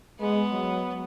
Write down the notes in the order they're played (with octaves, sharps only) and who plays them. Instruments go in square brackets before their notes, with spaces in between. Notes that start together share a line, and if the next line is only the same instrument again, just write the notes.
[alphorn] G#3 [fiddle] B3
[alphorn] F#3